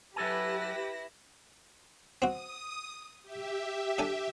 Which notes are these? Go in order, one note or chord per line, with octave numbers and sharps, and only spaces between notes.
F#3 E4 G4 A4 B4 G#5 A#6
C4 F#4 D#6
G4 E5
D4 A4 G#5